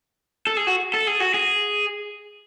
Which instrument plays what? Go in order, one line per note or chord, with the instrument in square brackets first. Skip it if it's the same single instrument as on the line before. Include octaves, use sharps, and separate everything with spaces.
[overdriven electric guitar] A4
G#4
F#4
A4
G#4
F#4
G#4